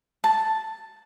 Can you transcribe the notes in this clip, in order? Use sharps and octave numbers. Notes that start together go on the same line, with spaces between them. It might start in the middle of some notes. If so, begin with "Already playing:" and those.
A5